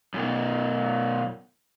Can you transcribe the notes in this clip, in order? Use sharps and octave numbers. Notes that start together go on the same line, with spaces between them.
F#2 B2